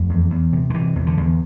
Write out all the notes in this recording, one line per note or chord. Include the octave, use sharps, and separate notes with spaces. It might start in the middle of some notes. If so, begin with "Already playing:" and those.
Already playing: F2 A3
E2
E2
C3
D3
C3 E3
E2
D3
E2